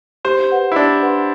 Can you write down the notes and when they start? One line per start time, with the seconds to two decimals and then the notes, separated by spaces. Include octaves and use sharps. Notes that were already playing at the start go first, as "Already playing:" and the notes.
0.25 G4 C5
0.50 B4 F#5 C6
0.72 E4
0.76 D4 G4
1.02 B4 F#5 C6